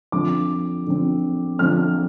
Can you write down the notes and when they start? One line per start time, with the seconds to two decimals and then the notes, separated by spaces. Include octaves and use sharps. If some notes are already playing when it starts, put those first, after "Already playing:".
0.12 D3 F3 C4 D6
0.87 D3 F3 C4
1.59 D3 F3 C4 F6